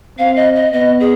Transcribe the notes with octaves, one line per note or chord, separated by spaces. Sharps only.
C4 F5
D#5
D#5
B3 D#5
G#4